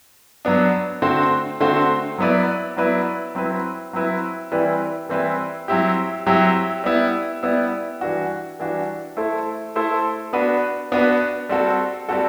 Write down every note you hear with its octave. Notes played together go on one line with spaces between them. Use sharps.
F#3 B3 D4
D3 A3 C4 F#4 C5
D3 A3 C4 F#4 C5
F#3 B3 E4 B4 D5
F#3 B3 E4 B4 D5
F#3 C4 E4 B4
F#3 C4 E4 B4
E3 G3 C4 E4 B4
E3 G3 C4 E4 B4
F#3 C4 E4 G4
F#3 C4 E4 G4
G3 B3 E4
G3 B3 E4
E3 G3 D4 F#4
E3 G3 D4 F#4
A3 E4 A4 C5
A3 E4 A4 C5
B3 D4 F#4 B4
B3 D4 F#4 B4
G3 C4 F#4 A4
G3 C4 F#4 A4